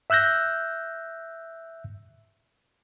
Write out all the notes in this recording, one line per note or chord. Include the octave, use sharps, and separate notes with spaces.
E5 E6 F#6 G6 A#6